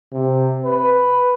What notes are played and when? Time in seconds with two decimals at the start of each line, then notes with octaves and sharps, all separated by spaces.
0.13 C3
0.66 B4